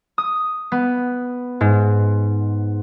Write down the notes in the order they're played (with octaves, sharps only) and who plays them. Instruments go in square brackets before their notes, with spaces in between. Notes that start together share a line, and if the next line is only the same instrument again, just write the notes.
[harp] D#6
B3
G#2